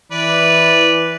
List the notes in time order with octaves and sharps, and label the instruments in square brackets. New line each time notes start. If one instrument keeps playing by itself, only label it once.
[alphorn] E3 [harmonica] B4 D5